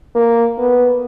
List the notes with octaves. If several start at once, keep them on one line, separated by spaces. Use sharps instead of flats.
A#3
B3